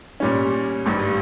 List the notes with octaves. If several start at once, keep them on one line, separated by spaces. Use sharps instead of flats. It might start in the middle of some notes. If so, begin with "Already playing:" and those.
A#2 G3 C#4
G#1 G2 G3